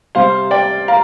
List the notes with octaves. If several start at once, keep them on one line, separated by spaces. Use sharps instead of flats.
C3 G3 C4 C5 F5
D5 G5
F5 A#5